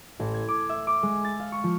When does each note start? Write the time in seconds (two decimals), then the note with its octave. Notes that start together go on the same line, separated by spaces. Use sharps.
0.20 A1
0.34 G#6
0.48 D6
0.69 E5
0.87 D6
1.03 G#3
1.24 A6
1.40 F5
1.52 C#6
1.64 F3